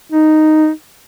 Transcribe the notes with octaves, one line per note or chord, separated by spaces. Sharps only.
D#4